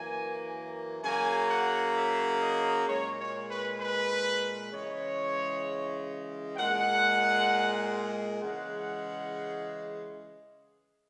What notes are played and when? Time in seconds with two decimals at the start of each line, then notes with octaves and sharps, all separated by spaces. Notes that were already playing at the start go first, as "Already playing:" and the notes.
Already playing: F#2 E3 A#3 G#5
1.03 C#3 F#3 A#3 G#5
1.49 F#5
1.96 E5
2.41 D#5
2.87 A#2 G#3 C#5
3.18 C#5
3.49 B4
3.80 B4
4.72 C#3 E3 G#3 C#5
6.56 A#2 G#3 F#5
8.41 C#3 E3 G#3 F#5